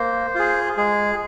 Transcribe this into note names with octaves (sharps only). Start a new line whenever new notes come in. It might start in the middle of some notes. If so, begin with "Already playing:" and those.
Already playing: A#3 C5
F4 G#4
G#3 G#4